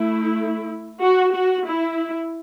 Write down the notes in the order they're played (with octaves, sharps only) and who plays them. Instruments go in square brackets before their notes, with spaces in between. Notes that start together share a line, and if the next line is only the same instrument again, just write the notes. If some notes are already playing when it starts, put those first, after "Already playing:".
Already playing: [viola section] A3 E4
F#4
F#4
E4